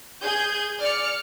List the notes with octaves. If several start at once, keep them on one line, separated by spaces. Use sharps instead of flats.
G#4 G6 G#6
D5 F6 C#7